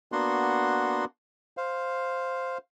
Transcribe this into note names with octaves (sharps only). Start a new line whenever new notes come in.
A#3 B3 D4 F#4 F#5 C6
C5 F5